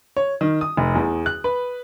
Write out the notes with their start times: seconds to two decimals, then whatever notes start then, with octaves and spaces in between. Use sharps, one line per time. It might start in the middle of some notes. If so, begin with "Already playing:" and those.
0.17 C#5
0.41 D#3
0.61 D#6
0.77 F1
0.95 E2
1.26 F#6
1.44 B4